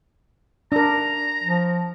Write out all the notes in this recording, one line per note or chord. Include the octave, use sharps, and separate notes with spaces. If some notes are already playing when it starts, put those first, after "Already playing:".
D4 A#4 A#5
F3